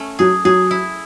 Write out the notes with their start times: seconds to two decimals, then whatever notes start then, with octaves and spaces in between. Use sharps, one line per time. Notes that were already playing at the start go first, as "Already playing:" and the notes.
Already playing: A3 C#4
0.19 F#3 G#4
0.45 F#3 G#4
0.71 E4